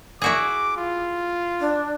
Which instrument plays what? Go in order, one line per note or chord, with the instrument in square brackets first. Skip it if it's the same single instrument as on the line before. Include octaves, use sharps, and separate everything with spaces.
[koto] E4 F#4 G#4 [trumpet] D6
[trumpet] F4
[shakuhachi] D4